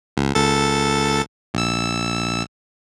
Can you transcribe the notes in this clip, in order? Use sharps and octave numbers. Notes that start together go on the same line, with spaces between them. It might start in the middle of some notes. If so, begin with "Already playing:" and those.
C#2
C#2 A4 A6
A#1 E6